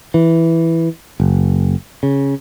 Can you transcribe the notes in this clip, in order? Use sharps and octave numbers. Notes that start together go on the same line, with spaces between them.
E3
F#1
C#3